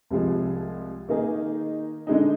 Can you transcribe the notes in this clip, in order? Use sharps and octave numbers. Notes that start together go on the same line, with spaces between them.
C2 C3 F3 G#3
D#3 A#3 D#4 G#4
D3 G#3 D#4